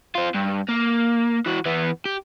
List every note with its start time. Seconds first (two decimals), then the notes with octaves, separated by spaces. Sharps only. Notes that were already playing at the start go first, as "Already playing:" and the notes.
0.15 C4 F4
0.35 G2
0.69 A#3
1.46 E3 F#4
1.66 E3 B3
2.05 G4